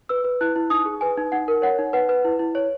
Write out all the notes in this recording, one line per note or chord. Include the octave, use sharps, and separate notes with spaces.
B4 E6
B4
E4 F#6
E4
D#4 D#6
G#4
B4 G#5
D#4
D#4 F#5
A#4
C#5 F#5
D#4
B4 F#5
B4
E4
E4
C#5